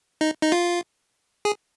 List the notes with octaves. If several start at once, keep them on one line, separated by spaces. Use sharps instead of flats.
D#4
D#4
F4
G#4